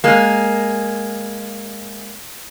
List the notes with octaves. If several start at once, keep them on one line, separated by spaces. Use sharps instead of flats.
G#3 A#3